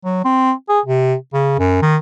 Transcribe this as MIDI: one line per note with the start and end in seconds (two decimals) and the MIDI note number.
0.05 0.22 54
0.24 0.52 60
0.69 0.80 68
0.86 1.14 48
1.34 1.57 49
1.59 1.80 42
1.82 1.97 51